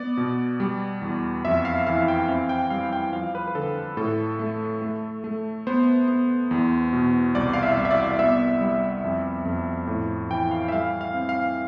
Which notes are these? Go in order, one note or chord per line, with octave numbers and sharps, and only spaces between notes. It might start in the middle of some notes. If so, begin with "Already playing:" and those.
Already playing: B3 D5
B2
G3
E2
F2 E5
F5
E3 F5
G5
C4 F5
G5
G3 F5
G5
F3 F5
B4
B4
D3 A4
A2 A4
A3
A3
A3
B3 C5
B3
E2
B2
C2 D5
F5
E5
C2
E5
D5
B3 E5
G3
F2
F2
A2
E3 G5
F5
E5
G3 F5
F5
C4
F5